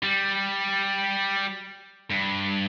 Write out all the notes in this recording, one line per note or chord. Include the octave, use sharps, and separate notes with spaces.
G3
G2